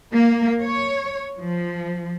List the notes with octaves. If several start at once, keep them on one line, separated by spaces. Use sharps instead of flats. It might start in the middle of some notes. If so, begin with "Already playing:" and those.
A#3
C#5
F3